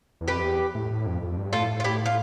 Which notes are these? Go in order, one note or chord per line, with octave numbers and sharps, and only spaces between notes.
E2
F2 G4 B4
E2
A2
A2
F2
F2
G2
A2 F4 A4
F4
E4 G4
F4